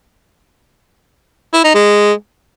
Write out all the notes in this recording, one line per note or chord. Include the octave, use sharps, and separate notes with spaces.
E4
D#4
G#3